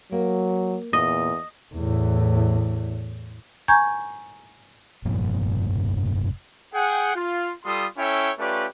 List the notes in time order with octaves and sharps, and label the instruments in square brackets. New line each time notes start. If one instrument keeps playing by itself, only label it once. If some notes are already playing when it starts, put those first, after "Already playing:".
[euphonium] F#3 [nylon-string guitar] A#3
[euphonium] E2 [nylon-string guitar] A#2 [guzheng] D#5
[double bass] E2 A2
[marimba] G#5 A#5 C#6 G6 G#6
[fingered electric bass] F1 G2 A#2 F3
[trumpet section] G#4 F#5 G5
F4
G3 F4 A4 C6 D#6
C#4 E4 A4 C#5 E5 G5
A3 C#4 F4 G4 B4 D5